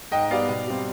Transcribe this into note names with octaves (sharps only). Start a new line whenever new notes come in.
G#2 D#5 G5
G3 B3 D5 F5
B2
G3 C4